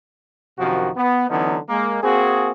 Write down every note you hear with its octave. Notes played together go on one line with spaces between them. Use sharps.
F#2 C3 D#3 F3 F#4
B3
D3 E3 F#3 B3 C#4 D#4
G#3 A#3
A#3 C4 F#4 G#4